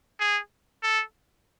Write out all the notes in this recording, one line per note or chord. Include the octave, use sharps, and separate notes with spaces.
G#4
A4